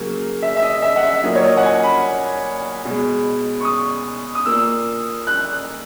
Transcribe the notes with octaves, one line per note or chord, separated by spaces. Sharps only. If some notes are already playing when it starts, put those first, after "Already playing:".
Already playing: C#3 F#3 A#3
E5
E5
D#5
E5
F#5
E5
A#2 F#3 A#3 D#5
C#5
D#5
F#5
G#5
B5
B2 G#3
C#6
D#6
D#6
A#2 A#3 E6
F#6